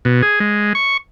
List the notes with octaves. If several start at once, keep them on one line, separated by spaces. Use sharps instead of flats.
B2
G#4
G#3
C#6